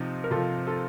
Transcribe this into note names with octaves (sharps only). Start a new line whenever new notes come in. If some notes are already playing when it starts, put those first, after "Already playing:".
Already playing: C3 F3 D#4
A#4
C3 F3 F4 A4
F4 A4